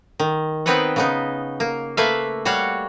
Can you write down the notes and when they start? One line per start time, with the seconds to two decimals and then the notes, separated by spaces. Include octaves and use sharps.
0.20 D#3
0.66 B3 C4 D#4 B4 C#5 F#5
0.96 C#3 B3 D#4
1.60 A#3
1.97 A3 A#3 B4 E5 F5
2.45 G3 F#4 C#5 F5 F#5